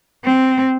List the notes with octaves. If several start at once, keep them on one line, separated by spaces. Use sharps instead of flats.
C4